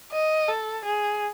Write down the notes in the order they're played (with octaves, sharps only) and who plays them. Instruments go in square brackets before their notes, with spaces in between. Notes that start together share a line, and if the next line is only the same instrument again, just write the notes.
[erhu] D#5
A4
G#4